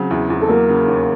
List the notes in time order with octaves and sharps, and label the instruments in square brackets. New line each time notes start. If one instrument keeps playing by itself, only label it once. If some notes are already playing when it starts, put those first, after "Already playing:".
Already playing: [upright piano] C#3 F#3 C4
E2
E2
[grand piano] A4
[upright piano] F#3 [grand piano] A#3 A#4
[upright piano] C#3
D#2